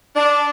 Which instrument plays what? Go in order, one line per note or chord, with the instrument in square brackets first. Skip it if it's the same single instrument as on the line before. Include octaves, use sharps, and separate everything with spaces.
[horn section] D4